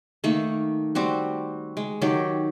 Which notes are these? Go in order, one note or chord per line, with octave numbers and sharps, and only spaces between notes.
D#3 A3 A#3 C#6
G3 C4 F#4
G#3
D#3 F#3 G4 D6